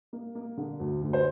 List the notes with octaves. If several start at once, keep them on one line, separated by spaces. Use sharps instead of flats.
A#3
A#3
D3
D2
D2
C5